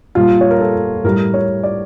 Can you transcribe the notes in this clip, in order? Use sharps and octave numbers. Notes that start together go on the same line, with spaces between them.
A#2 G3 F4
C#5
A#4
A4
A2 G3 A#4
C#5
D5